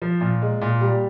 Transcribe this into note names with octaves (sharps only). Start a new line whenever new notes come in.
F3
A#2
G#3
A#2
G3